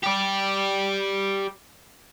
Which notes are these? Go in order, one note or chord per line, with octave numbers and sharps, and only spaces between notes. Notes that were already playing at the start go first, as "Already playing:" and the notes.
G4 D5